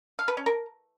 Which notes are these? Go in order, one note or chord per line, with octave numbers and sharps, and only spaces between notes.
F5
B4
C#4
A#4